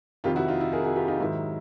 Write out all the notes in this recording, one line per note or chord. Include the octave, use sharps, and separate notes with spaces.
F2 C3 D#3 F4 G4
E4 F#4
D#4 F4
E4
G#4 A#4
F#4 G#4
F4 G4
D#4 F4
G#2 D#3 F#3 E4